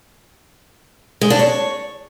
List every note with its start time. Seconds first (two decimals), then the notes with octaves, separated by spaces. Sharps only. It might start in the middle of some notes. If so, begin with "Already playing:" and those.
1.21 G#3
1.30 D4
1.39 C#5